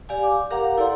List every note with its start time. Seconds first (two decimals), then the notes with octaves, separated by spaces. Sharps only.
0.09 G4 D5 F5 G#5
0.23 D6
0.50 G4 A#4 F5 F#5 A#5
0.77 E4 A4 D5 F#5 A#5 C6